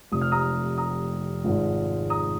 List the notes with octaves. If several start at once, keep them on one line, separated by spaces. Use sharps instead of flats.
F1 F2 C3 D#6
F6
A#5 D#6
A#5 D#6
G#1 G#2 F3 G#3
A#5 D#6